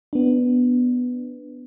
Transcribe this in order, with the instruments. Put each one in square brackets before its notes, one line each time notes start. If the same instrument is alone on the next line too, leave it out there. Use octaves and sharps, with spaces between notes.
[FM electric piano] B3 D4